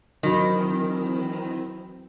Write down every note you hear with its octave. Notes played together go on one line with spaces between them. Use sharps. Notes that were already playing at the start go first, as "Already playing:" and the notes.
D#3 E3 F#3 C4 B5